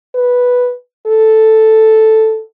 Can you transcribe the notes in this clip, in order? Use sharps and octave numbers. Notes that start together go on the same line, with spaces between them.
B4
A4